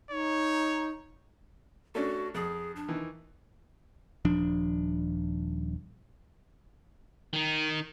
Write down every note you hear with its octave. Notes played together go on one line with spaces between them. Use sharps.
D#4 C#5
A3 C#4 D4 F#4
F2 G#4
D4
D#3 E3
D#1 F3 D4
D#3 D#4